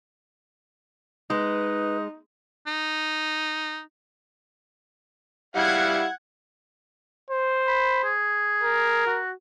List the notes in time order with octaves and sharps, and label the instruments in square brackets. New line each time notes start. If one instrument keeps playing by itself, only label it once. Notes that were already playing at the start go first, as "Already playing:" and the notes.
[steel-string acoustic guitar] G#3 [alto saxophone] D#4 [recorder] B4
[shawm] D#4
[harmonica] G3 E4 F5 [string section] F#5 G#6
[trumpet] C5
[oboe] B5
G#4
[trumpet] A#4
[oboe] F#4